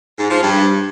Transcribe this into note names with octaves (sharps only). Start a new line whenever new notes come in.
G#2
F3
G2